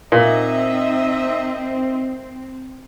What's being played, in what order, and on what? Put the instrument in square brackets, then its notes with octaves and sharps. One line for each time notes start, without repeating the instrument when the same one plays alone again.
[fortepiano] A#2 [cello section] C4 [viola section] D#4 D#5 E5